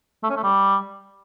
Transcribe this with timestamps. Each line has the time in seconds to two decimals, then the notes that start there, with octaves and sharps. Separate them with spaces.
0.23 A3
0.30 C#4
0.36 A3
0.43 G3